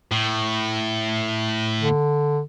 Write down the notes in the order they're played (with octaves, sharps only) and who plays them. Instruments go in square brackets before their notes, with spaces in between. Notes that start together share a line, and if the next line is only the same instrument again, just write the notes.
[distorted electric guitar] A2
[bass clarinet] D3